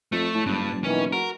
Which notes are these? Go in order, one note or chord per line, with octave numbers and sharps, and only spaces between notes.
F2 A3
A2 A5
F#1 G2
F#1
B2 D#3 E3 C#4
F#4 A#4